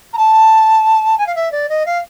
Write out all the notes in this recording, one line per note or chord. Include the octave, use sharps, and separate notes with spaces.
A#5
A5
G#5
F5
E5
D5
D#5
F5